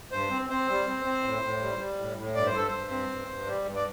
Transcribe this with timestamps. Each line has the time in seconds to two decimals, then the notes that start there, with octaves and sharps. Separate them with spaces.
0.12 G2 C5
0.30 C4
0.50 C4 C5
0.69 G3
0.87 C4
1.05 C4
1.24 A2
1.42 A2
1.61 G3
1.79 G3
1.99 A2
2.17 A2
2.35 G2 D5
2.46 C5
2.53 G2 A4
2.67 G2 C5
2.91 C4
3.09 G2
3.28 G2
3.46 G3
3.65 G2
3.76 D5